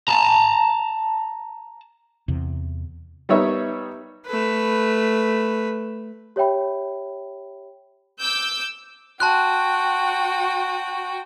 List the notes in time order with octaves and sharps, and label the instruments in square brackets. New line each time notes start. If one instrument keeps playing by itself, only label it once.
[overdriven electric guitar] A5 A#5
[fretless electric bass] E2 C3
[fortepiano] G3 B3 D#4 C#5 E5
[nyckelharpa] A3 B4
[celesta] G4 C#5 E5 G5 B5
[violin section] D6 E6 G6
[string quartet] F#4 G5 [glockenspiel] A5 C6 F#6